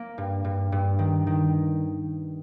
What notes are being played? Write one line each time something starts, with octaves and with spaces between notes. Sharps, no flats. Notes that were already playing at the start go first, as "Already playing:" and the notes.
Already playing: A#3
G2
G2
G2
D#3
D#3